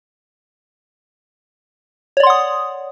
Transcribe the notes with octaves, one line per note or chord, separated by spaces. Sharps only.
C#5 D5 F#5 C6 D#6